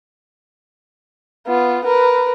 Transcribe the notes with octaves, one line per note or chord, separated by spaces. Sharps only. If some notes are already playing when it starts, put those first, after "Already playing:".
B3 F4
A#4 B4